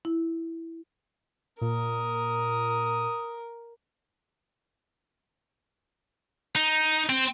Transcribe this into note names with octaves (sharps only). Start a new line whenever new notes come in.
E4
A#2 A#4 D#6
D#4
C4